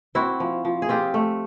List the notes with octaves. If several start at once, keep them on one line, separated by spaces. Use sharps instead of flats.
C4 E4 F#4
F3
F3
G#4
C4 F4 G4
A3